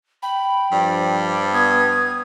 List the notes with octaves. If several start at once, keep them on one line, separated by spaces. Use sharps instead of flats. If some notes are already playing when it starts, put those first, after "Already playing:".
G5 B5
G2 F3 D5
B3 D#6 G#6